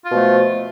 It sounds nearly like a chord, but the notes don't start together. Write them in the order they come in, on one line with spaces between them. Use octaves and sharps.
F4 B2 F3 A3